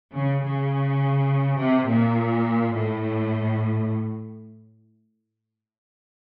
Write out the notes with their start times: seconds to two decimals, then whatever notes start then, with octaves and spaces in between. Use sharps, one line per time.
0.15 C#3
0.43 C#3
1.59 C3
1.87 A#2
2.73 A2